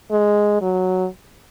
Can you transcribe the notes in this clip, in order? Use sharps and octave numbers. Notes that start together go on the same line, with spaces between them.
G#3
F#3